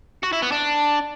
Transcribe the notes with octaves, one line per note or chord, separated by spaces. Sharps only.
F#4
E4
B3
D4